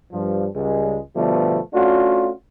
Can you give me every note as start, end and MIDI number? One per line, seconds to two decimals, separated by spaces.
0.12 0.47 43
0.12 0.47 53
0.55 0.98 37
0.55 0.98 55
0.55 0.98 56
1.16 1.59 47
1.16 1.59 50
1.16 1.59 53
1.16 1.59 55
1.16 1.59 57
1.16 1.59 59
1.74 2.30 57
1.74 2.30 61
1.74 2.30 62
1.74 2.30 65
1.74 2.30 66